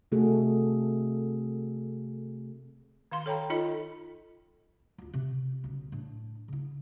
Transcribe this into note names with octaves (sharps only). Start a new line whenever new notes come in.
C3 A3 F#4 G#4 A4
D#3 F5 C6
A4 C#5 G5 A#5 B5
D#4 F4 A4 D#5 B5
D2 F4
C3
B1 C#3
A2 D4
C#3 E4